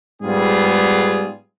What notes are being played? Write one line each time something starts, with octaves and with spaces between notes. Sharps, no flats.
G#2 G3 B3 F4 G#4